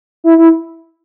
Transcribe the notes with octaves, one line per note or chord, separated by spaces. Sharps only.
E4
E4